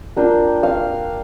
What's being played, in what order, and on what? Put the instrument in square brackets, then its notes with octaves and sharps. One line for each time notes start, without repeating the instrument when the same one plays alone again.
[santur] A#3 D4 F4 G5
F5